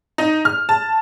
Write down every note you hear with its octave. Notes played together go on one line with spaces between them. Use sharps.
D#4
F6
A5